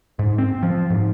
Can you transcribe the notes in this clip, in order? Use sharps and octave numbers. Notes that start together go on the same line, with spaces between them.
G#2
C4
F3
G#2